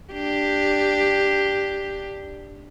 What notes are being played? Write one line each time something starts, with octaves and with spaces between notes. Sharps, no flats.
D4 G4